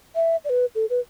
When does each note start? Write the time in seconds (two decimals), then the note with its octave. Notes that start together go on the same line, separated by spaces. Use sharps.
0.15 E5
0.45 D5
0.50 B4
0.75 A4
0.90 B4